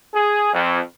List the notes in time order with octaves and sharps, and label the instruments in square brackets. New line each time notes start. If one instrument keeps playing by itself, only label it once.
[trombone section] G#4
F2